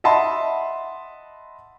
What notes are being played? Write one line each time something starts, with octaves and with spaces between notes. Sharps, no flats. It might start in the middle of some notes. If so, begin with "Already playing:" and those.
D#5 E5 F#5 A5 B5 C6